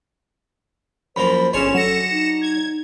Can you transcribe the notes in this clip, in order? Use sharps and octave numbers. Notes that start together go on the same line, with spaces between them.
F#2 F3 A#3 C5 B5
G1 C#4 D4 G#4 C#5 C6 E7
F#3 A4 A#6 C#7 E7
D#4
G#6